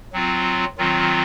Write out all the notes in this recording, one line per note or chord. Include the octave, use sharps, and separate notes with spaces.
F#3 C4 F4
D#3 F#3 C4 F4